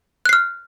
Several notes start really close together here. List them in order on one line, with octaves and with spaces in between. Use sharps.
F#6 C7 F6